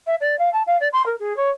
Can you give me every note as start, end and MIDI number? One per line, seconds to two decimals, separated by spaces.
0.07 0.15 76
0.20 0.38 74
0.39 0.49 77
0.52 0.62 81
0.66 0.77 77
0.80 0.88 74
0.93 1.04 84
1.06 1.15 70
1.19 1.36 68
1.36 1.50 73